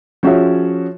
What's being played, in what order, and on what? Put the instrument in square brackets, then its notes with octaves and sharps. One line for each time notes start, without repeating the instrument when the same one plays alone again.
[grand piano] F3 C#4 F#4 G#4 C#5 E5